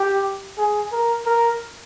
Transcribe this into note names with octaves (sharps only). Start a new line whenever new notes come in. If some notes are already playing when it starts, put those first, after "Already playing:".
Already playing: G4
G#4
A#4
A#4